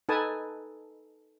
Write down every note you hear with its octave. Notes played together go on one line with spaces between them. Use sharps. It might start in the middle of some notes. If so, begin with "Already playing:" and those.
D#4 A4 B4 G#5 A5 D#6